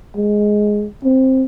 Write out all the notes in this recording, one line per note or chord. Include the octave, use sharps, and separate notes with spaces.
G#3
C4